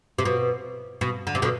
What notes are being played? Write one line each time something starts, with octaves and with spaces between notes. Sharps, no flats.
C3
B2
B2
D3
C3
B2 D3